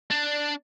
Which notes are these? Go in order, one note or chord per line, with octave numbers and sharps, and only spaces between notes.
D4